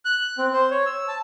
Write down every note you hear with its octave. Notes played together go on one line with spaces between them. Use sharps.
F#6
C4
C5
C#5
E6
A5